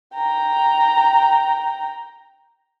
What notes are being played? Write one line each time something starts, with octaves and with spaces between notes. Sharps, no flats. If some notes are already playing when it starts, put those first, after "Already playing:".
G5 A#5